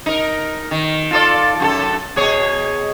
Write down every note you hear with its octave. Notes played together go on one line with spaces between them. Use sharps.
D#4 A#4
D#3
F4 A4 D5
F#2 F#4 A4
B2 G#4 C#5